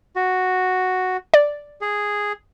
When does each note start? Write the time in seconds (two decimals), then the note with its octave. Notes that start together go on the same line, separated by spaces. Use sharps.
0.16 F#4
1.34 D5
1.81 G#4